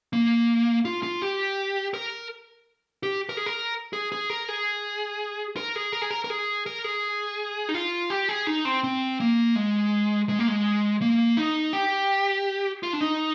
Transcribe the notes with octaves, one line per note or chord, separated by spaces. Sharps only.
A#3
F4
F4
G4
A#4
G4
A#4
G#4
A#4
G#4
G#4
A#4
G#4
A#4
G#4
A#4
G#4
A#4
A#4
G#4
A#4
G#4
D#4
F4
G4
G#4
D#4
C4
C4
A#3
G#3
G#3
A#3
G#3
A#3
D#4
G4
F4
D4
D#4